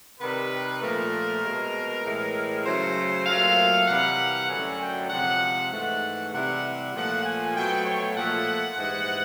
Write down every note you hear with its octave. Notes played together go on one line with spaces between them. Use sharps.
C3 D#3 G3 B4
A#2 F3 A3 A#4
B2 G#3
A2 E3 G#3
C#3 F#3 A3 C5
A#2 F#3 A3 F5
C3 E3 G3 F#5
F#2 D3 F#3 A3 G#5
G5
C3 F3 G#3 F#5
G#2 E3 A3 F#5
C3 E3 G3 F#5
A#2 F3 A3 F#5
G#5
B2 F#3 A3 G5
C#5
A#2 F3 A3 F#5
G#2 E3 G3